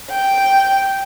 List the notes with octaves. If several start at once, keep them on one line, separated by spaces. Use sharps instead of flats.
G5